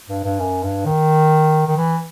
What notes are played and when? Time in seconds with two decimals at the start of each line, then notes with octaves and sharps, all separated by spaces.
0.09 G2
0.24 G2
0.40 F#2
0.63 G2
0.86 D#3
1.67 D#3
1.77 E3